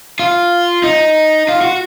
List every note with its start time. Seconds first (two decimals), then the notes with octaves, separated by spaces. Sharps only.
0.19 F4
0.84 D#4
1.49 F4
1.61 F#4